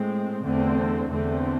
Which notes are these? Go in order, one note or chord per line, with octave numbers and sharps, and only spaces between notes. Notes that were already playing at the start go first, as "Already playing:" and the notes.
Already playing: A2 G#3 C4
E2 D3 A3 C4
E2 D3 A3 C4